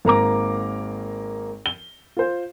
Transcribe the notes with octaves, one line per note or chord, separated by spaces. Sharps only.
G#1 A#3 A#5 D6
G7
F4 C5